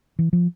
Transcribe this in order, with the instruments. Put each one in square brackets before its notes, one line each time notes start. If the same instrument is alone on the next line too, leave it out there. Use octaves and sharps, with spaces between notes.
[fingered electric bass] E3
F3